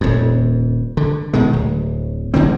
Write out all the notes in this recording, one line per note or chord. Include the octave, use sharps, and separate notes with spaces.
D#1 F2
D3
B2 D#3 G#3
D1
E1 D3 F#3 C4